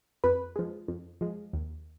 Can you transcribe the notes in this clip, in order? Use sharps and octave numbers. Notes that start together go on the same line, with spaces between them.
F2 B4
F3 G#3
F2
F3 G#3
D#2